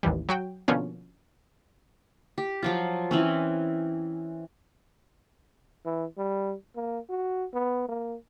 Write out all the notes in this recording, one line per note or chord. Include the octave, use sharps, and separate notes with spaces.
A1 D#2 E3 G3
F#3 F#4 G5
B2 D3 F3 A#3 B3 C#4
G4
F3 F#3 F4
E3 C4 C#4
E3
G3
A#3
F#4
B3
A#3